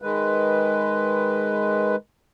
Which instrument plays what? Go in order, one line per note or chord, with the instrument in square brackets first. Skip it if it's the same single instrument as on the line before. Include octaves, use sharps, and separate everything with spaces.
[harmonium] D#3 G#3 B4